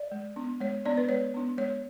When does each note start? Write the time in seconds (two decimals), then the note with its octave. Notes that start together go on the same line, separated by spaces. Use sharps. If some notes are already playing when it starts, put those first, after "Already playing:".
Already playing: D5
0.12 G#3
0.36 B3 D4
0.61 G#3 C#5
0.85 B3 D4 D5
0.97 B4
1.09 G#3 C#5
1.34 B3 D4
1.57 G#3 C#5